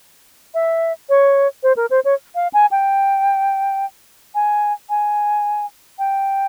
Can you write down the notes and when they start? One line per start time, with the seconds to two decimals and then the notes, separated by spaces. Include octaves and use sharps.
0.54 E5
1.09 C#5
1.63 C5
1.76 A#4
1.90 C5
2.05 C#5
2.35 F5
2.54 G#5
2.71 G5
4.35 G#5
4.90 G#5
5.99 G5